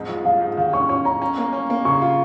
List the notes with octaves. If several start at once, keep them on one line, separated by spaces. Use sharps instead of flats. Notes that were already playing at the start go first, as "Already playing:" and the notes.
Already playing: F2 G#2
F3
F3 F5
G#2
D#3 F5
C#4 C#6
C#4 C#6
C#4 A#5
C#4
A#3
C#4
A#3
C#3 C#6
F4